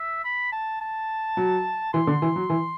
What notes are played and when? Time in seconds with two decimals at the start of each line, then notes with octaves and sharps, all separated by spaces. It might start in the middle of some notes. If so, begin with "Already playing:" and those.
Already playing: E5
0.24 B5
0.52 A5
0.81 A5
1.37 F#3
1.93 E3 C6
2.07 D3
2.22 E3
2.36 F#3
2.50 E3